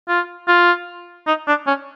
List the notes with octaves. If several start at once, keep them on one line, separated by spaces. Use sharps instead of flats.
F4
F4
D#4
D4
C#4